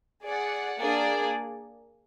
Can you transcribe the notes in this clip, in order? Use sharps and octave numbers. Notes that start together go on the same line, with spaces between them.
G#4 D5 F#5
A#3 D4 G#4 D5